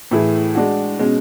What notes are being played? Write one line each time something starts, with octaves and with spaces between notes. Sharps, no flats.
A2 E3 A3 E4 G#4
G#3 D4 F#4
B2 G#3 C#4